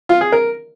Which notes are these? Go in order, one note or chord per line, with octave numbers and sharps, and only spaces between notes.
F4
G#4
A#4